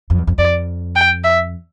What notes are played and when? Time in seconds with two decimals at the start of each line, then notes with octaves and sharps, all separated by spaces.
0.10 F2
0.18 E2
0.27 F2
0.38 F2 D5
0.95 G5
1.24 E5